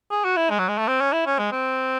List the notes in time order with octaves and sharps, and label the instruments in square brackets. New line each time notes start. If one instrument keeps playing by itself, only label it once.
[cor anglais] G#4
F#4
E4
G#3
F#3
G#3
A3
C4
C#4
E4
C#4
G#3
C4